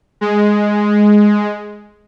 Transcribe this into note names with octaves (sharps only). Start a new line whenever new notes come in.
G#3